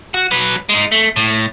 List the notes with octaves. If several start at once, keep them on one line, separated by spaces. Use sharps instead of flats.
F#4
F#3 B4
G#3 D#4
A3
A2